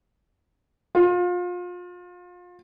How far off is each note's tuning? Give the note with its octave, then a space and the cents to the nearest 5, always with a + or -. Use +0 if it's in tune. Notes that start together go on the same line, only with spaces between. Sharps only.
F4 +30